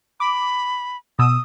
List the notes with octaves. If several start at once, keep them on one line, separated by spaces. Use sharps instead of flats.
B5 D6
B2 D#6 E6